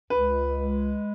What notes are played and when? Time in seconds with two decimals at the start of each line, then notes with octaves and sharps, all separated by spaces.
0.10 C#2 B4
0.58 G#3